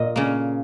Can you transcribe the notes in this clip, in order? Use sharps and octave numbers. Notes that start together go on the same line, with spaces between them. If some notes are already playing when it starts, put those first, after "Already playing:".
Already playing: A#2 D#5
C#3 A#3